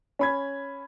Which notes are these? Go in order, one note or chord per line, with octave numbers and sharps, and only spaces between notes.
C#4 B5 G#6